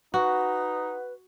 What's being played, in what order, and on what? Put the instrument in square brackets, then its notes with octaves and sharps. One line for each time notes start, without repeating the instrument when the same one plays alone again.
[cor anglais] D#4 [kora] F#4 [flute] B4 [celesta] F#5